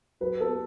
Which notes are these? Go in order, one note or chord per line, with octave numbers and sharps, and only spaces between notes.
F#3 B4
B3 A4